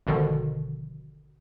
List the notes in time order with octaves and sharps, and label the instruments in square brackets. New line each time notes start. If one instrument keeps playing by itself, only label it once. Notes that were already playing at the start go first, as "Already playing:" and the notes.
[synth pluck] G#1 B2 D3 D#3 F3